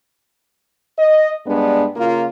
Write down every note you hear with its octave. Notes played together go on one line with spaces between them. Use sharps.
D#5
G2 G#3 B3 D4
C#3 A#3 F4